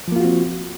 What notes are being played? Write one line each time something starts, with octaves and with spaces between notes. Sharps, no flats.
F3 A#3 C4 F4 F#4